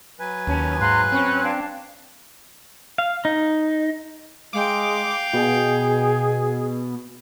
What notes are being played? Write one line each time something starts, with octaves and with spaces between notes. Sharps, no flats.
F#3 B4 G#5
D#2 C#4 A5
G#2 F5 A#5 C6 F#6
C4 C#4 C#5 B5
D4 F5 A5
F5
D#4
G#3 F5 G5 D6
B2 G#4